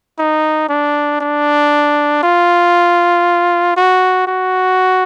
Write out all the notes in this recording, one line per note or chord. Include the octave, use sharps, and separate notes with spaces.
D#4
D4
D4
F4
F#4
F#4